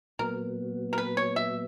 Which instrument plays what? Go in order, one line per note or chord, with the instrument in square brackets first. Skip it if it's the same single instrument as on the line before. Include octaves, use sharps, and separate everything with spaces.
[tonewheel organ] A#2 F#3 B3 [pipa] A#4
[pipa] A#4
B4
C#5
E5